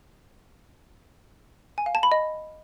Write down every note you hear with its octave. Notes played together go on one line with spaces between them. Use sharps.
G#5
F5
A5
B5
D#5